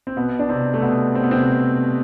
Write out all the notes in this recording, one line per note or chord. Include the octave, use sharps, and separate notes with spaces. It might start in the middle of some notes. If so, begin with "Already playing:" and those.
C4
B2 B3
D4
C3 C4
A3
B2 B3
C4
B3
C3 C4